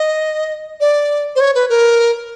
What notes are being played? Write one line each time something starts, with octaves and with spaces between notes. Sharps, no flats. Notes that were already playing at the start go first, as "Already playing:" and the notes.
Already playing: D#5
D5
C5
C#5
B4
A#4